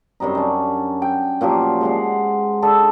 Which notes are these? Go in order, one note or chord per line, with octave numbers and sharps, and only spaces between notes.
F#2 C3 G3 D#4
C#4 D4
G5
A#2 F3 F#3 G4
G#3 C5 F#5
D4 G#4 A4 E5